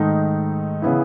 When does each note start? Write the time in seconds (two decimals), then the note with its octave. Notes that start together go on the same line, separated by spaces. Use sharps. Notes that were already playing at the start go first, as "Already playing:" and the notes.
Already playing: G#2 D#3 A3 D#4
0.82 C#3 E3 B3 E4